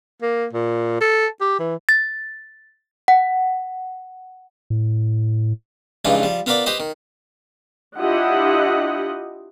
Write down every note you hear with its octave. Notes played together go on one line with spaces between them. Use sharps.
A#3
A#2
A4
G4
E3
A6
F#5
A2
C#2 G2 E3 F3 D#4 F4
F3 G3
B3 F4 A#4 B4 D5 D6
G4 B4 C5 D#5
D#3
D4 E4 F4 G4 D#5 F#5